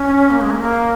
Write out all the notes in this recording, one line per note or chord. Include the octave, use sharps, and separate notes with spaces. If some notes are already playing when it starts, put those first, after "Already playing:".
Already playing: C#4
A#3
G#3
A#3
A#3